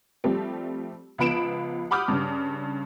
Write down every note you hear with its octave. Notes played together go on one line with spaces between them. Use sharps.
F3 G3 A3 C4 G4
C#2 F3 B3 B5 D7 E7
F#5 B5 D6 D#6 F6 G6
G2 C#3